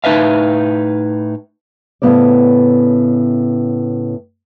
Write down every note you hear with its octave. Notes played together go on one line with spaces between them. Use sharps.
A2 D#4 B4 E5 F5
A2 C#3 F3 B3 C5 D5